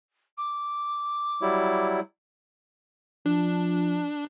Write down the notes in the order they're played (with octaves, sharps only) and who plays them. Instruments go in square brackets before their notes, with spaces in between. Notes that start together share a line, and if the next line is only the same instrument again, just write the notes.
[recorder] D6
[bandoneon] F#3 G3 E4
[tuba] F3 [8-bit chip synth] D4